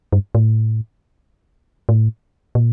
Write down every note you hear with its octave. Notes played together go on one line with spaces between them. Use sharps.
G2
A2
A2
A#2